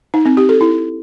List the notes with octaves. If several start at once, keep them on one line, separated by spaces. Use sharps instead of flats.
D#4
C4
G4
A4
E4